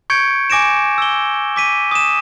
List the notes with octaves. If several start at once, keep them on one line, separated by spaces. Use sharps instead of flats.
C#6 G6 G#6 C#7 D7
G#5 D6 A#6 D7 E7
E6 G7
D6 B6 D#7
D#6 E7